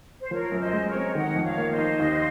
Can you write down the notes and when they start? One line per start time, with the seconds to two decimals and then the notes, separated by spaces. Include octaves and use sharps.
0.21 C5
0.31 F3 A#4 C#5
0.52 F#2
0.59 C5 D#5
0.73 G#3
0.87 A#4 C#5
0.94 C4
1.15 D#3 D#5 F#5
1.36 F2
1.43 C#5 F5
1.57 A#3
1.71 C5 D#5
1.78 D#4
1.99 D#2